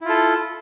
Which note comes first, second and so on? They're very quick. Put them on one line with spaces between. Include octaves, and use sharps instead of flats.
E4 F4 A4